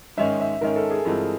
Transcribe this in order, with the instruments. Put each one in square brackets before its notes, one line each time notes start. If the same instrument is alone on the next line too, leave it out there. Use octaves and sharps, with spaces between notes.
[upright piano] G#2 D#3 G#3 C#4 [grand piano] E5
[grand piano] E5
[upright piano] G#2 D#3 G#3 C#4 [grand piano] A#4
[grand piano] A4
G#4
[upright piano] G2 E3 G#3 C4 F4